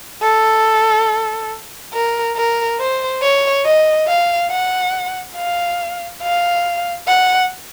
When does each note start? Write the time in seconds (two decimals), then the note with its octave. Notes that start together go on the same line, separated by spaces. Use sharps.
0.22 A4
1.93 A#4
2.36 A#4
2.80 C5
3.22 C#5
3.65 D#5
4.08 F5
4.51 F#5
5.36 F5
6.23 F5
7.08 F#5